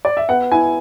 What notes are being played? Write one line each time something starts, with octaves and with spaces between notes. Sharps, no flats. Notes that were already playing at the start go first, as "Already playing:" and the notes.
D5
E5
B3 F#5
E4 G#5